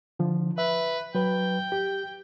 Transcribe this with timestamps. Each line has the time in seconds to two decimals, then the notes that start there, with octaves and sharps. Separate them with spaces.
0.19 D3 F3
0.58 B4 E5
1.15 F#3 B4 G5
1.72 G4